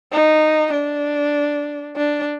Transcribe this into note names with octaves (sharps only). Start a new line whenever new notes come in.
D#4
D4
D4